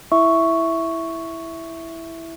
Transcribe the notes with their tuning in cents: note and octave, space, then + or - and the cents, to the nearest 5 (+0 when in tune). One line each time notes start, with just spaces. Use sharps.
E4 +0 E5 +0 C#6 +0